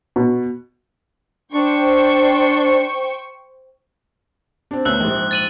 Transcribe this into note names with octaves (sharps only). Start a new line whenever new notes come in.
B2
D4 C5 G5 C#6
C4 D4
D2 B3 C#4 E6 F#6
A#1 G#2
A6 D#7 F#7